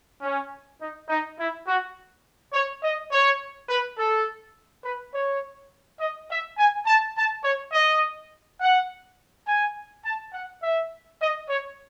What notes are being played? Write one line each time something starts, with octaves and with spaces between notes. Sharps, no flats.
C#4
D#4
D#4
E4
F#4
C#5
D#5
C#5
B4
A4
B4
C#5
D#5
E5
G#5
A5
A5
C#5
D#5
F#5
G#5
A5
F#5
E5
D#5
C#5